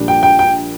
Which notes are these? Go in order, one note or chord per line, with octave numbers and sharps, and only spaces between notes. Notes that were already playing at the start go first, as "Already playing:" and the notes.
Already playing: A#1 A#2 G3 D4
G5
G5
G5